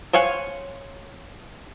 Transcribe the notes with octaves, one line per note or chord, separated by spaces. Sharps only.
C5 C#5 F5 F#5 G#5